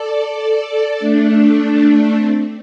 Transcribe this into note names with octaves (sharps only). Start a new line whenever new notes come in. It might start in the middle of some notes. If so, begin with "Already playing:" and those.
Already playing: A4 D5
A3 D4
A3 D4
C4